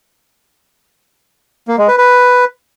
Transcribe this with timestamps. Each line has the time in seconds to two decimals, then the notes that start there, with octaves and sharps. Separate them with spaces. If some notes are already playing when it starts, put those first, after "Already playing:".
1.68 A#3
1.78 G#3
1.88 B4
1.98 B4